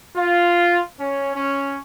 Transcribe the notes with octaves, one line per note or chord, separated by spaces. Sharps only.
F4
C#4
C#4